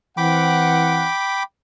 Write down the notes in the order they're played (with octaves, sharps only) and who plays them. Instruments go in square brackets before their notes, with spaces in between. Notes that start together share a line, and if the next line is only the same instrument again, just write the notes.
[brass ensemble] E3 C4 F#5 [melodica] G5 B5 D6